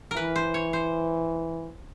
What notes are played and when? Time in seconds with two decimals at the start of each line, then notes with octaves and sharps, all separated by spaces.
0.11 A#4
0.17 E3 B4
0.36 C5
0.54 C#5
0.73 C5